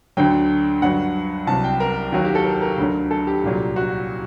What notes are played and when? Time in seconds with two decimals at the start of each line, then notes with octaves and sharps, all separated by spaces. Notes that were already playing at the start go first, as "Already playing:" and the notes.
0.17 D2 D3 F#3 G5
0.82 G2 F#3 F#5
1.47 C2 C3 F#3 A5
1.64 G5
1.80 A#4
2.12 D#2 D#3 F#3 F#4
2.25 G4
2.35 A4
2.45 A#4
2.62 A#4
2.78 D2 D3 F#3 A#4
3.11 A4
3.27 G4
3.43 C2 A#2 F#3
3.76 F#4